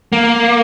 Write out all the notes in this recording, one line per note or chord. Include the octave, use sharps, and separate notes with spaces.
A#3